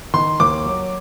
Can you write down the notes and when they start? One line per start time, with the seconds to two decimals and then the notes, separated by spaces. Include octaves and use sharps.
0.14 D#3 C6
0.40 D#2 D6
0.66 F#3